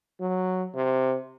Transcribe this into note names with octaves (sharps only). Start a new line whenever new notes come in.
F#3
C3